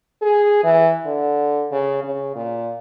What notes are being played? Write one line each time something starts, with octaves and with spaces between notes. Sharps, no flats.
G#4
E3
D3
C#3
C#3
A#2